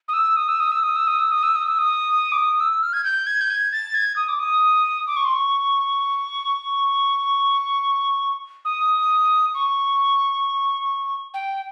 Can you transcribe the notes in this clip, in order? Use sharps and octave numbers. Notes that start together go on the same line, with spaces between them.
D#6
E6
D#6
E6
D#6
E6
D#6
E6
D#6
E6
D#6
E6
D#6
E6
D#6
D6
D#6
E6
F6
G#6
G6
G#6
G6
G#6
A6
G#6
D#6
D6
D#6
D6
C#6
C6
C#6
D#6
C#6
G5